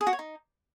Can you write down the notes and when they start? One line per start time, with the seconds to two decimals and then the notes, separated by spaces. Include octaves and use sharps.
0.01 G#4
0.07 F#4
0.13 C#5
0.19 D#4